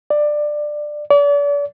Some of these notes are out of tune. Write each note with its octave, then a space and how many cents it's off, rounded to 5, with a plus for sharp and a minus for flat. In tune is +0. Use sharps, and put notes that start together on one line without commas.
D5 +15
D5 -40